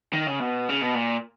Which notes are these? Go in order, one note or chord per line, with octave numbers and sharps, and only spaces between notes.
D#3
C#3
B2
C#3
B2
A#2